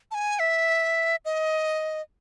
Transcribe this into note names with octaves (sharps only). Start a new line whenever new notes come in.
A5
G#5
E5
D#5